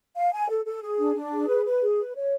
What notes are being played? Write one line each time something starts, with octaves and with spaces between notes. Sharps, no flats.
F5
G#5
A4
A4
G#4
D4
D4
G#4
B4
B4
G#4
B4
C#5